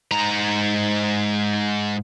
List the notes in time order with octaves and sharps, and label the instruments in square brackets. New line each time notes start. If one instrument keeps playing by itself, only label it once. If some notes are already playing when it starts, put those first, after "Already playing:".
[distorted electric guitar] G#2 A#5